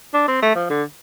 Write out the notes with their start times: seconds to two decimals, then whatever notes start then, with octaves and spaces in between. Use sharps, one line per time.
0.14 D4
0.28 C4
0.43 A3
0.55 F3
0.70 D3